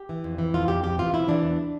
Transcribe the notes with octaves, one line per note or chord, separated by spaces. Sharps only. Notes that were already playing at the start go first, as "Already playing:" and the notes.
Already playing: G4
E3
F2
E3
F2 F4
F2 G4
C3 G4
E3 F4
C3 E4
E3 D4
E2